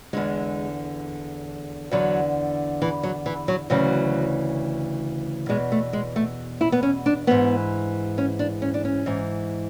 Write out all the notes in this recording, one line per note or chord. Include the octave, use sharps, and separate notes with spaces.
E2 D3 G#3
E2 D3 F#3
E3
F#3
E3
F#3
D2 C#3 E3 F#3
E2 B2 G#3
A3
G#3
A3
E4
B3
C#4
D4
G#2 E3 B3
C#4
D4
C#4
D4
C#4
G#2 E3